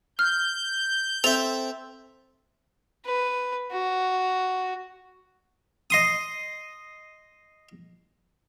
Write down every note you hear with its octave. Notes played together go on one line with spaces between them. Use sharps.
F6 G6
C4 A4 E5 F7
B4
F#4
D#5 C6 D#6